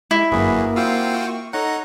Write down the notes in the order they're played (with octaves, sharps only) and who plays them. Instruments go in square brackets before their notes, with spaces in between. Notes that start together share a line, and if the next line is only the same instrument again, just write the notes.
[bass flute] G#3 [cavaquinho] E4
[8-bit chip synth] G1 F#2 [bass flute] A#3 [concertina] F#4 G#4 B4
[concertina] C4 F5 E6 [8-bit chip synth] F4 F#4 G5
[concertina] C#6
[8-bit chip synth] D#4 F#5 [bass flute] A4 [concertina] C#5 A#5